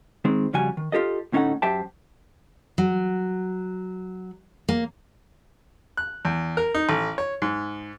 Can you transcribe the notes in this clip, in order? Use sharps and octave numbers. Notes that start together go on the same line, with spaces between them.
D#3 G#3 C4
F2 C#3 G3 F#4 G#5
D#3
F4 G4 A4 D#5
D2 A2 C#4 D#4 A4 F#5
F#2 G4 C5 E5 G5 A5
F#3
A#3
F#6
E2
A#4
D#4
A1
C#5
G#2